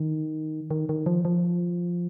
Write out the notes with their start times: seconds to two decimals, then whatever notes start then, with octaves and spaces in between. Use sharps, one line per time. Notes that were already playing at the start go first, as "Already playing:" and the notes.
Already playing: D#3
0.71 D#3
0.89 D#3
1.06 F3
1.25 F3